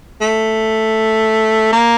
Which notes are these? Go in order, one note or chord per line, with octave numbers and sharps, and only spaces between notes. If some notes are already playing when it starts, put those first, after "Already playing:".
A3
A#3